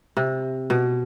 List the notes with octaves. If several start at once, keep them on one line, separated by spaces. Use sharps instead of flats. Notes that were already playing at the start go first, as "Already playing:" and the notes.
C3
B2